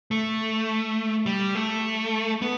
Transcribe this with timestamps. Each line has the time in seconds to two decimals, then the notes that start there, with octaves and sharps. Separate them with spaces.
0.11 A3
1.26 G3
1.55 A3
2.42 B3